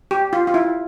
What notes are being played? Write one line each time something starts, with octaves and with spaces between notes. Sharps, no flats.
G4
F4
F4
E4